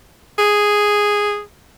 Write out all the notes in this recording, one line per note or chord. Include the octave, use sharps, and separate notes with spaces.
G#4